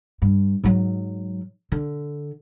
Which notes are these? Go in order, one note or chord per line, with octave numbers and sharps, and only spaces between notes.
G2
G#2 F#3
D3